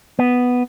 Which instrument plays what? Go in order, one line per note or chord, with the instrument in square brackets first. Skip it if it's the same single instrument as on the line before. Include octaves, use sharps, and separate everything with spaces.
[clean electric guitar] B3